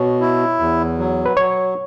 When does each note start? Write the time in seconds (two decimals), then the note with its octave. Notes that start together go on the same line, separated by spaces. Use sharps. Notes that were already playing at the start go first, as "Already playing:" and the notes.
Already playing: B2 C#5
0.21 E4
0.59 E2
0.98 F#3
1.26 B4
1.37 F#3 C#5